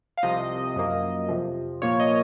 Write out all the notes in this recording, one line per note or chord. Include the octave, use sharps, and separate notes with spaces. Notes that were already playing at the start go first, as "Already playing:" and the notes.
F5
C2 C3 F3 D#5
F#2 F3 A#3
F2 C3 F3
A#2 F3 A#3 C#5
D#5